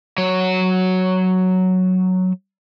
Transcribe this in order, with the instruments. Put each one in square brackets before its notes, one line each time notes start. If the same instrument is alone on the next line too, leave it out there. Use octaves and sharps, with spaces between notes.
[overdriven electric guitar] F#3 C#5